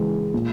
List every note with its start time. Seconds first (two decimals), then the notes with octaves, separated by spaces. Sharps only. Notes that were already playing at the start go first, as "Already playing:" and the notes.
Already playing: C#3 E3 G#3
0.34 A#2